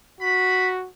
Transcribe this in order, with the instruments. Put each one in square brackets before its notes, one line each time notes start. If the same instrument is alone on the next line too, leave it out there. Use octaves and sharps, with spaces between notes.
[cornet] F#4 [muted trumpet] B5